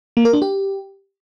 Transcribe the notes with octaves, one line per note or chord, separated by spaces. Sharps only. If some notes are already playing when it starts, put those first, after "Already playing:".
A#3
A#4
D4
G4